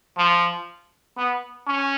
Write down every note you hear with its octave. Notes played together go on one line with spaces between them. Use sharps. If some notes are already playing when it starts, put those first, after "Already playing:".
F3
B3
C#4